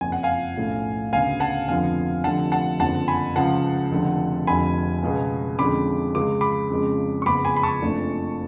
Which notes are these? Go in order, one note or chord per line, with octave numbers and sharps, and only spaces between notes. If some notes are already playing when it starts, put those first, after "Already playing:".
F#1 F2 F3 G#5
F#5
F5 G#5
B1 A2 F3 A3 C#4
D2 C#3 F#3 B3 F5 G#5
F#5 A5
F1 F2 D3 F3 B3 F5 G#5
F1 F2 D3 F3 F#5 A5
F#5 A5
F#1 F2 D3 F3 F#5 A5
G#5 B5
C#2 C#3 F3 F#5 A5
F1 F2 D3
F1 F2 D3 G#5 B5
C#2 B2 G#3 B3
F2 D3 G#3 C#4 B5 D6
C#2 C#3 G#3 D6
B5 D6
F2 C#3 G#3 C#4
C#6
F#1 F2 C#3 G#3 B3 B5 D6
G#5 B5
B5
A5 C#6
F#1 F2 F3 A3 D4